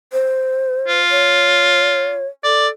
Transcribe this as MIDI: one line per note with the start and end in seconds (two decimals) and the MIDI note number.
0.13 1.00 72
0.88 2.24 65
1.11 2.27 73
2.44 2.70 69
2.44 2.68 74